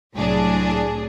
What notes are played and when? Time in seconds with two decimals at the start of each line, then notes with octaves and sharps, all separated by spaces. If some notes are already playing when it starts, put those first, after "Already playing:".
0.15 C2 A2 F#3 D4 G#4